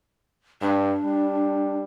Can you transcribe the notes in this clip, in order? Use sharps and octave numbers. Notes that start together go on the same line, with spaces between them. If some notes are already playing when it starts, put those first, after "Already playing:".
G2 D4
G3